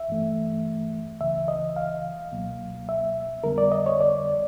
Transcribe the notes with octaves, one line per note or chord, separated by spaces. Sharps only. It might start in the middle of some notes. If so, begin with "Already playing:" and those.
Already playing: E5
G2 E3 A3
C#2 C#3 E3 E5
D#5
F5
C#2 B2 F#3 A#3
E5
F2 D3 G3 B3 A#4
D5
D#5
C#5
D5